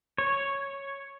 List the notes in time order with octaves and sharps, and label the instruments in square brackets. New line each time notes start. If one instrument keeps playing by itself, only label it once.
[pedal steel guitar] C#5